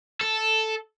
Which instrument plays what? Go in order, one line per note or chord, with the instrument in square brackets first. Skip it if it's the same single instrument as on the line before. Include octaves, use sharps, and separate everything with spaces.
[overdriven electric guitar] A4